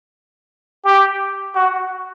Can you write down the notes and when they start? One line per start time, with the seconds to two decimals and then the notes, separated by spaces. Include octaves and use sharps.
0.84 G4
1.56 F#4